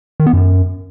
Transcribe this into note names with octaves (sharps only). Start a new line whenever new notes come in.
D#3
B3
F#2